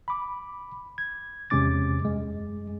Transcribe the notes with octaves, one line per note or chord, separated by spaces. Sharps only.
B5 D6
G#6
E2 C3 G#3 C#4 D6 A6
F#2 G#3